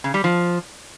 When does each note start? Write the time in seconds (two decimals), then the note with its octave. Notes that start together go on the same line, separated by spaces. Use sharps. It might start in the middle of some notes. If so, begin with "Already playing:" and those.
0.04 C#3
0.14 G3
0.24 F3